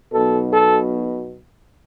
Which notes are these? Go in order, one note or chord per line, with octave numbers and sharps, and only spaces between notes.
B1 B2 A4
A4